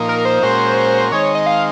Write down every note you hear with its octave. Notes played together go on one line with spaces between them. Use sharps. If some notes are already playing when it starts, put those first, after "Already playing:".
Already playing: A#2 F3 A#3 D#4
A#4
C5
A#2 G#3 C#4 F#4 A#4
D#3 G#3 C4 D#4 C#5
D#5
F5